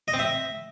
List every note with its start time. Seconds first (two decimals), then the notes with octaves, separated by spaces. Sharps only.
0.08 D#5
0.14 C4
0.19 E5